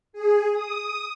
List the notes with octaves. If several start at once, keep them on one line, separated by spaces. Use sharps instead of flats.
G#4
D#6